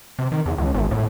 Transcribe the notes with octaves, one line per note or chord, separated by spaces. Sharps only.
C3
D#3
E2
C#2
G#1
A2